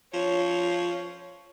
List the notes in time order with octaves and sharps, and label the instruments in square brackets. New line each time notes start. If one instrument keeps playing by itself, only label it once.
[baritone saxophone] F3 [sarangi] C#5